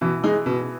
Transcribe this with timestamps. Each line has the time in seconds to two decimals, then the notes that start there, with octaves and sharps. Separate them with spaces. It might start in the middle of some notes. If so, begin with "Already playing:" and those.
0.01 B2 E3
0.24 G#3 D#4 G#4
0.46 B2